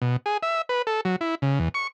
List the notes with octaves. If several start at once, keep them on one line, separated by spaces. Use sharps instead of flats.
B2
G#4
E5
B4
A4
F#3
E4
C#3
E2
C#6